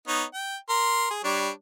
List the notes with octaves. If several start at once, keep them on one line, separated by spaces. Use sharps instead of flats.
B3 D#4 C#5
G5
A#4 C6
G#4
G3 D4 C#5